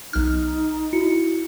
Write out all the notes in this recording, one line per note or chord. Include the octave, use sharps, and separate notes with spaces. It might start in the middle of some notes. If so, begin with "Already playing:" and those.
B1 D#4 F6
E4 F#4 C#7